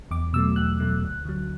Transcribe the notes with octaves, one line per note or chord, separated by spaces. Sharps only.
E2 D6
B2 F#3 A3 E6
E2 F#6
B2 F#3 A3
D2
D3 F#3